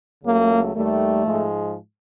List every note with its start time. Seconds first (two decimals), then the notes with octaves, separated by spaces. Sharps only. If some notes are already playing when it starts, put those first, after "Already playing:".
0.24 C#2 C#3 F#3 A3 A#3
0.74 D#2 D#3 G3 A3
1.25 G#2 F3 G#3